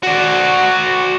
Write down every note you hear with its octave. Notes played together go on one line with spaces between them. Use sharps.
F#4 D5